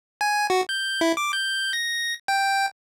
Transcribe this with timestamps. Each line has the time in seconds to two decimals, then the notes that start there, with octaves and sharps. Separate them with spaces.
0.21 G#5
0.50 F#4
0.69 G6
1.01 E4
1.17 D6
1.33 G6
1.73 A#6
2.28 G5